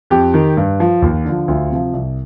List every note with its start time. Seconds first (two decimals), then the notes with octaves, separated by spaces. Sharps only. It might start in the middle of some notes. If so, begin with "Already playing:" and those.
0.10 F2 G4
0.34 D#3
0.57 G2
0.80 F3
1.02 D#2
1.25 D3 F3
1.48 D2 F4
1.70 C3 F3
1.93 C2